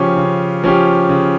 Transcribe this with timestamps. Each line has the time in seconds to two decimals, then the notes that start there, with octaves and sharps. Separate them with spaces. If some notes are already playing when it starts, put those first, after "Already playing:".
Already playing: C#3 F3 C#4 G4
0.16 C#3
0.64 F3 C#4 G4
1.09 C#3